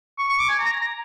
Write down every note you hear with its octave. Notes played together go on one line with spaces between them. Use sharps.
C#6
C#6
D6
G#5
A#5